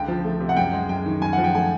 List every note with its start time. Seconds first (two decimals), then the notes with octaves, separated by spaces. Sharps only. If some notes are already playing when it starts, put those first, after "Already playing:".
Already playing: C#2 D3 G5
0.08 F3
0.24 A3
0.40 C3
0.49 F#5
0.57 F#2 G5
0.73 G#3
0.89 F#2 G5
1.06 D#3
1.22 F#2 G#5
1.33 F3 F#5
1.44 G5
1.54 A3 G#5